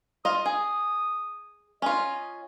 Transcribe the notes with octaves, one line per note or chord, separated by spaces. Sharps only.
F4 D#5 D#6
G#4
C#4 F4 D#5